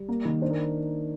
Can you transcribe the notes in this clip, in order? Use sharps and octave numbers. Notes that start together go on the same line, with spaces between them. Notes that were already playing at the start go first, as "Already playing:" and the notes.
Already playing: G3
A#3
D#3
D4 C5
A#4